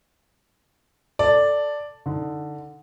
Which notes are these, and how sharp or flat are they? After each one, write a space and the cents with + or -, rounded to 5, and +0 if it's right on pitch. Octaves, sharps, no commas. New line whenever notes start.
A4 +5 D5 +0
D3 +5 D#4 +15